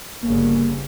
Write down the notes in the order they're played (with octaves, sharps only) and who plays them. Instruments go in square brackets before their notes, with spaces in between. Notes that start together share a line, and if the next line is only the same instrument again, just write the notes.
[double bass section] G1 G2 C#3 [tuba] A#3